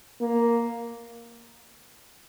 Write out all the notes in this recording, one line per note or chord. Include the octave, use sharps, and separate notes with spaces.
A#3